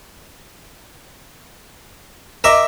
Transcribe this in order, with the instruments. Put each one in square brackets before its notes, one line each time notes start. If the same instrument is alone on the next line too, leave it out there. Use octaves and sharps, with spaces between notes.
[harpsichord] A#4 E5 [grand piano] D#5 D6 E7